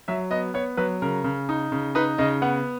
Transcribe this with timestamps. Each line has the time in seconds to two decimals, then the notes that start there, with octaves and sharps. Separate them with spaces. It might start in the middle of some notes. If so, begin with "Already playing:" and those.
0.08 F#3 E5
0.31 B3 D#5
0.54 B3 C#5
0.77 F#3 B4
1.02 C#3 A#4
1.24 C#3
1.49 D#4
1.72 C#3
1.95 D#4 B4
2.18 C#3 D#5
2.42 B3 F#5